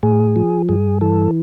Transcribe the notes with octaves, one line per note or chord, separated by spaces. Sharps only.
A2 G#4
F3
G2 G#4
E3 A4